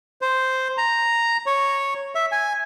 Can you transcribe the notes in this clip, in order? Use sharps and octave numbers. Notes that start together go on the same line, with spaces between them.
C5
A#5
C#5
E5
G#5